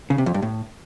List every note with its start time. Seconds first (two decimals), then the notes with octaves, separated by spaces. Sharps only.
0.10 C#3
0.18 C3
0.26 F2
0.34 G2
0.42 A2